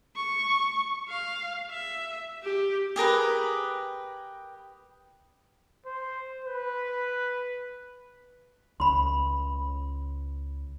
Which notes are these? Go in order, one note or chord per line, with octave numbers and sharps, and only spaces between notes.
C#6
F5
E5
G4
G4 G#4 A#4 B4
C5
B4
C#2 B5 C6